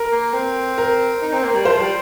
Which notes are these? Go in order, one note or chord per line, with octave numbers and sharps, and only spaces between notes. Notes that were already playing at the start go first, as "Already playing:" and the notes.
Already playing: A#4
A#3
C4
A#4
D#4
C4
A#3
G3
F3 C5
G3